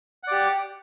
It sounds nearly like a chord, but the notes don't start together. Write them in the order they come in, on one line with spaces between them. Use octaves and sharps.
F#5 D5 G4